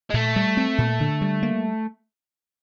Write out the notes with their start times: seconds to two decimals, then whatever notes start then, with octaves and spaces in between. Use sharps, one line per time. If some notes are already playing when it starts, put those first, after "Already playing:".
0.10 G#3
0.14 A#2 A3
0.36 G3
0.57 C4
0.78 A#2
1.00 D3
1.21 G3
1.43 A#3